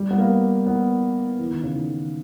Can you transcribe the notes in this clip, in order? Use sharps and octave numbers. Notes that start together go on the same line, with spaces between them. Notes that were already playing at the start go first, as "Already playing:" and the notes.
Already playing: G3
B3
A#3
B3
E3
D#3
C#3
D#3